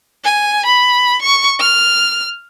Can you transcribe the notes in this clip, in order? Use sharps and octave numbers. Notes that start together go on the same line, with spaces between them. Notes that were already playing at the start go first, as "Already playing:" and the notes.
G#5
B5
C#6
F6